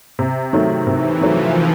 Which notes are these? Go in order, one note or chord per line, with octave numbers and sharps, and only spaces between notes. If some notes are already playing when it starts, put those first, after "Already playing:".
C3
D#3 F#3 A3
C3 E3
D#3 F3 F#3 A3